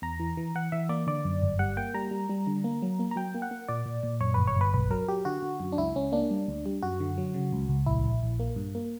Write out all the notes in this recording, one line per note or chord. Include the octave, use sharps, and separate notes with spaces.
E2 A#5
E3
E3
E3 F#5
E3 E5
A#3 D5
D3 D5
F#2
G1
G3 F#5
A#3 G5
G3 A#5
G3
G3
D3
A#3
F#3
A#3
A#5
F#3 G5
A#3
F#5
A#3
A#2 D5
A#2
A#2
F#2 C#5
G1 B4
C#5
G1 B4
B1 B4
F#3 A#4
F#3 G4
D3 F#4
D3
F#2
D4
C#2 E4
C#2 C#4
A#3 D4
G3
D2
G3
F#2 F#4
D3
F#3
C#3
C#2
C#2
A#1 E4
A#1
A#1
A#3
G2
A#3